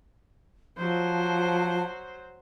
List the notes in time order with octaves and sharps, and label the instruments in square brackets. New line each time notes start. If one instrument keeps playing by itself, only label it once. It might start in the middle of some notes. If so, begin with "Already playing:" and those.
[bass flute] F3 [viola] F#3 C5